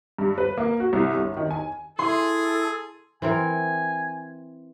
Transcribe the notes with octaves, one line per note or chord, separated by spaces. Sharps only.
G2
B4
A#3
F#4
C2
G1
D#3
G#5
E4 G#4 A4 C6
E3 C4 A#4 G#5